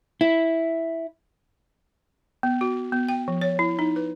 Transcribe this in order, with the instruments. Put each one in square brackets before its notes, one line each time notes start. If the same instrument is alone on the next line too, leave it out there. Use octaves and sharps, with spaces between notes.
[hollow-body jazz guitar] E4
[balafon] B3
F#4
B3
G5
F3
C#5
E4
D#4
B4